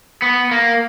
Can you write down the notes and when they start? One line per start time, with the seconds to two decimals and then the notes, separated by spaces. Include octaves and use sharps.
0.22 B3
0.51 A#3